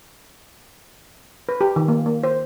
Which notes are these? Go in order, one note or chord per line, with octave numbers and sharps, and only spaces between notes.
B4
G4
D#3
A#3
A#3
C5